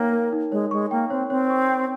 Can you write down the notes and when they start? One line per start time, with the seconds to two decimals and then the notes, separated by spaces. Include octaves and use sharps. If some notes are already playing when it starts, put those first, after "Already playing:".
Already playing: A#3 D#4 A#4 C#5 G5
0.13 A#4
0.32 D#4
0.52 G#3 C#5
0.71 G#3 C#6
0.91 A#3 G5
1.10 C4 C#5
1.30 C4 C#5
1.50 C#6
1.70 G5